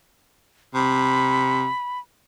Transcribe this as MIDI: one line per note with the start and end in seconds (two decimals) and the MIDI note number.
0.75 1.67 48
0.75 1.99 83